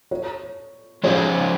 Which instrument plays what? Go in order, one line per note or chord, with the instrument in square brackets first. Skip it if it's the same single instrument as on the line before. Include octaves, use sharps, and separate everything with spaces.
[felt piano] C#5
[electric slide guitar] F3 G#3 C#4 G#4 C5 [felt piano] C#5